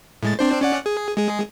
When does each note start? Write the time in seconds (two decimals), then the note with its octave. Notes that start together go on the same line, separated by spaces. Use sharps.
0.23 A2 G#3 A6
0.39 C4 D4 C5
0.61 C#4 D5 F#5
0.86 G#4
1.17 G#3 G#4